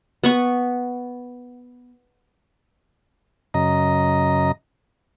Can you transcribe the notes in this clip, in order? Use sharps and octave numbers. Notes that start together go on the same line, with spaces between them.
B3 F#5 C#6
F#2 C#3 D#5 A#5